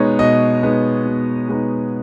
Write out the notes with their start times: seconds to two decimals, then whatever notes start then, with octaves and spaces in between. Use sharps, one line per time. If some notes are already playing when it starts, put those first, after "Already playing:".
Already playing: B2 G#3 B3 D#4 C#5
0.19 B2 D#5
0.62 G#3 B3 D#4
1.05 B2
1.48 G#3 B3 D#4